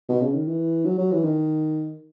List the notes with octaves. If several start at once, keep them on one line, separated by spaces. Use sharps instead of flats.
B2
C#3
D#3
E3
F#3
F#3
E3
D#3